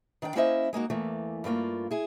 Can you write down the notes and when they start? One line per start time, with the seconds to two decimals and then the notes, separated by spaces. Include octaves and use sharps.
0.22 D#3 D4 E5 G5
0.35 A#3 C#4 E4 C5 D#5 E5
0.73 G#3 A#3 D#4 F#4
0.90 E2 E3 A3 A#3
1.44 G2 A3 A#3 F4
1.91 E4 G#4